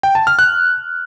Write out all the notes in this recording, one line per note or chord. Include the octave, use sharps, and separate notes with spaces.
G5
A5
F6
F#6